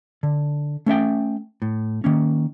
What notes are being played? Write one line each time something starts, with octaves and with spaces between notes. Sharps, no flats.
D3
A3 C#4 E5 G5
A2
D#3 A#3 C#4